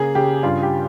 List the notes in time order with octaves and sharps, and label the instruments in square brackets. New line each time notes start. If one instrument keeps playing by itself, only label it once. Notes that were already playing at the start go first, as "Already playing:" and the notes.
Already playing: [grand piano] C#3 A#3 G#4
C#3 G4
G2 F4
G4